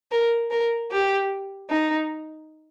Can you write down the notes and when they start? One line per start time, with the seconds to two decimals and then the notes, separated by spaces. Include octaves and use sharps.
0.12 A#4
0.51 A#4
0.91 G4
1.70 D#4